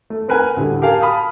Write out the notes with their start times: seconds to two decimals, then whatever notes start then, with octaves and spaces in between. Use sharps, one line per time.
0.10 A3
0.28 C4 A#4 B4 F#5 G#5
0.57 D2 A2 D3 G3
0.82 G4 A#4 F5 G#5 A5
1.01 A5 B5 D#6 F6